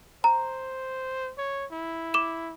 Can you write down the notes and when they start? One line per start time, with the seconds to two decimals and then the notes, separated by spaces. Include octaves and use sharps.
0.24 C5 A#5
1.38 C#5
1.72 E4
2.14 D6 E7